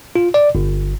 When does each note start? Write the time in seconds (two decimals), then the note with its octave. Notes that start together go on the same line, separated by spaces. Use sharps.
0.16 F4
0.34 D5
0.55 G1